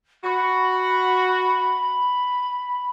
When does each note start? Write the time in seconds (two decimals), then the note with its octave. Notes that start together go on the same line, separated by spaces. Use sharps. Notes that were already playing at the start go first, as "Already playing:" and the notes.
0.24 F#4 B5